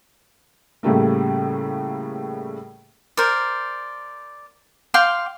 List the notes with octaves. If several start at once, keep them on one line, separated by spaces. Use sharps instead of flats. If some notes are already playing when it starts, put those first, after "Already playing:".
A2 C#3 G3 A3 A#3
A#4 C5 D5
F5 G5 C6 D6